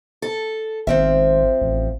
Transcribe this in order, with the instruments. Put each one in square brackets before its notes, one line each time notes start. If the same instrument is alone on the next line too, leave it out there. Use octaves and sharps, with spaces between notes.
[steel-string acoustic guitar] A4
[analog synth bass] G#1 [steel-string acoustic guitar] F3 C4 E5
[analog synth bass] A1